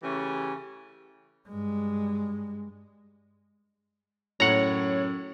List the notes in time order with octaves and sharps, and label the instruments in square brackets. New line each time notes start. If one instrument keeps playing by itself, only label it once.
[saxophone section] C#3 E3 A3 C#4 G4
[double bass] G2 G#3
[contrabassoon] F#2 [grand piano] A2 [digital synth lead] C#5 [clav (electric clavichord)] F#5 A#5